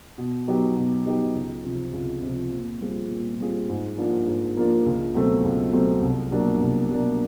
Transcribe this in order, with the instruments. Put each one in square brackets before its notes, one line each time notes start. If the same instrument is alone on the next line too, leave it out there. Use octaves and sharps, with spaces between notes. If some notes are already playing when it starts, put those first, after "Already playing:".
[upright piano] B2
F#3 B3 D#4 G4
B2
F#3 B3 D#4 G4
C#2
C3 F3
C#2
C3
F3
A#2
G3 C4 F4 G#4
A#2
G3 C4 F4 G#4
G#2
F3 A#3 D4 F4
G#2
F3 A#3 D4 F4
C#2
B2 F#3 A3 C4
C#2
B2 F#3 A3 C4
C2
B2 F#3 A#3 D4
C2
B2 F#3 A#3 D4